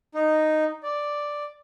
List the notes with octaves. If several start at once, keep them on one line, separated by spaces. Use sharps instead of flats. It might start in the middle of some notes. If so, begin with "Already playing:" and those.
D#4
D5